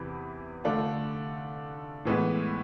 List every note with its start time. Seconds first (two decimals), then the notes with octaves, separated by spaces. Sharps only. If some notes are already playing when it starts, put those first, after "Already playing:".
Already playing: E2 C3 E3
0.64 D3 A3 D4 F4
2.05 A2 E3 G#3 B3